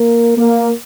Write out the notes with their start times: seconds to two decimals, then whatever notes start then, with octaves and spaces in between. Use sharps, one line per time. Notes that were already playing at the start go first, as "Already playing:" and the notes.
Already playing: A#3
0.37 A#3